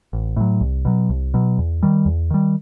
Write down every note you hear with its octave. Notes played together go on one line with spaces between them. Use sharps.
A1
A2 F#3
C2
B2 F#3
C2
B2 F#3
E2
D#3 G3
E2
D#3 G3